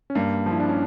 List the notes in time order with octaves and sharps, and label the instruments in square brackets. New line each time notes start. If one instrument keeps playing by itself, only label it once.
[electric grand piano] C#4
[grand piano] G2 [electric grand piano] A#3
[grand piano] F3
[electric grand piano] E4
D4
C#4